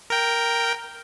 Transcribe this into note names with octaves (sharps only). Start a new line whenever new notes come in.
A#4 G5